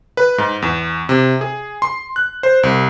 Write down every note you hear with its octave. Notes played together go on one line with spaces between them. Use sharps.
B4
G#2
E2
C3
G#4
C6
F#6
C5
C2